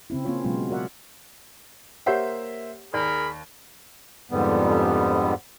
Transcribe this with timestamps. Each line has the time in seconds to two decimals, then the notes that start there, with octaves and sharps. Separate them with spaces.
0.10 C#3 C4 E4
0.25 A#3 C4 C#4 F4 C#5
0.44 B2 F#3 G#3 B3 F4
0.70 F#4 A#4 C#5 D5 E5 F#5
2.06 A#3 G4 C5 C#5 E5 F#5
2.94 D#2 G#4 A#4 D5 B5
4.31 F2 G#2 D3 G3 B3